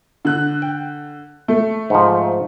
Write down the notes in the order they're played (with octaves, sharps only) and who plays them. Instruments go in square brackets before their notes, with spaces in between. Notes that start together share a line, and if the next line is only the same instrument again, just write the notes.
[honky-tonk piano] D3 F#6
[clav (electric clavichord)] G5
[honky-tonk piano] A3
[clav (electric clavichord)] G#2 F3